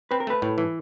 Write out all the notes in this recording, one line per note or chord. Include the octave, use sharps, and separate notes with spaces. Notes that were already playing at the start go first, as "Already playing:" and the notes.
C4 B4
A#4
A3 B4
A2
E3